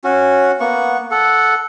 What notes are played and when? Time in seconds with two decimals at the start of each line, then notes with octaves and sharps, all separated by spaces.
0.04 C#4 F#4
0.60 A#3 B3 F#5 C#6
1.11 A4 F#5